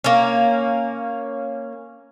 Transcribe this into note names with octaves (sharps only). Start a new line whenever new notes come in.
A#3 C#4